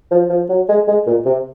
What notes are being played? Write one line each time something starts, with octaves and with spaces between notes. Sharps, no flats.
F3
F3
F#3
G#3
G#3
A#2
C3